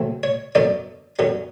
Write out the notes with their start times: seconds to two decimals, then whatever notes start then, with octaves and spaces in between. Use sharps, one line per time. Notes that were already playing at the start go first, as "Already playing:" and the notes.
Already playing: C#2 C#3 F#3 A3 C4
0.23 C#5
0.55 F#2 D3 F#3 B3 D5
1.19 F#2 D3 F#3 B3